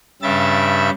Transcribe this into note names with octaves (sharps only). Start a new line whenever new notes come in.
G2 C#3 G3 E5 A6